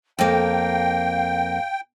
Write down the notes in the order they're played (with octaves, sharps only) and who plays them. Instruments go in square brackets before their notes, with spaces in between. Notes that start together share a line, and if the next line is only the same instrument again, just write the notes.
[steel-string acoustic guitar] F2 A#3 [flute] F5 [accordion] G5